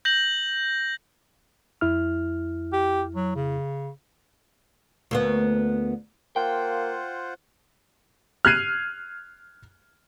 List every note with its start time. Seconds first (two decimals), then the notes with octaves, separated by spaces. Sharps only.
0.05 G6 A#6 F#7
1.81 F2 E4 F6
2.73 G4
3.15 F#3
3.35 C#3
5.11 D2 A#3 B3
6.36 A#3 F4 C5 F#5 G5
8.45 F6 F#6 G#6 C7 D#7